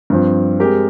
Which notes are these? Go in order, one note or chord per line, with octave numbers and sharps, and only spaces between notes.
G2 F3 C4
G#3 C4 G4 A#4